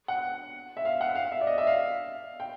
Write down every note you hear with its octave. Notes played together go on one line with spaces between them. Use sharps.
F#5
E5
F5
F#5
F5
E5
D5
D#5
E5
F5
G5